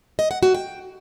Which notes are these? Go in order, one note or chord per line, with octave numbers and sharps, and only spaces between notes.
D#5
F#5
F#4
G5